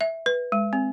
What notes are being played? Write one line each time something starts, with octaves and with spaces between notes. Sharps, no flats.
E5
B4
G#3
C4